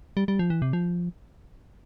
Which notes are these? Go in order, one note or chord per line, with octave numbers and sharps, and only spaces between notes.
G3
G3
F3
E3
C3
F3